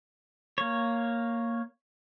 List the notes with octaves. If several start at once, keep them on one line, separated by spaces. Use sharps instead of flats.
A#3 C#5